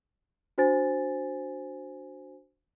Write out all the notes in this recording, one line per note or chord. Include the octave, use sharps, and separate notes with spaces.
D4 F#4 C5 G#5 A6